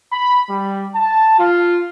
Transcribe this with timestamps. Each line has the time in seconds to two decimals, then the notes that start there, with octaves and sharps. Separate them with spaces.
0.12 B5
0.50 G3
0.95 A5
1.39 F4